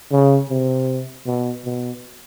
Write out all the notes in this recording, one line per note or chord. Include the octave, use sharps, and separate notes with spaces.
C#3
C3
B2
B2